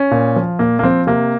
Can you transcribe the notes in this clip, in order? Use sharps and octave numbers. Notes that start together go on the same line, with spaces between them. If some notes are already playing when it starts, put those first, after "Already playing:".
Already playing: C#4
A#2
F3
A#2 A#3
A#3
F3 C4
C3 A#3